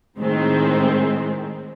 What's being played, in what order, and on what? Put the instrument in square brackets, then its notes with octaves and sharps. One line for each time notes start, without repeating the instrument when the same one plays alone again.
[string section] A2 D#3 G#3 C4